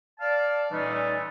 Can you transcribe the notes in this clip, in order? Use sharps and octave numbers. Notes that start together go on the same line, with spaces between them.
D5 F5 A5
A#2 E3 G3 A3 C#4 D#4